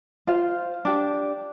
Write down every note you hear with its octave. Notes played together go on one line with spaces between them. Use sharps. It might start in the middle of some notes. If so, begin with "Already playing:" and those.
F4 C5 F5
D4 G4